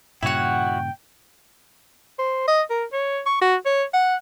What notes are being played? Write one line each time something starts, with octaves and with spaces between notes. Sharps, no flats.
G2 A#2 C#3 E4 F#4 C#5 F#5 G5
C5
D#5
A#4
C#5
C#6
F#4
C#5
F#5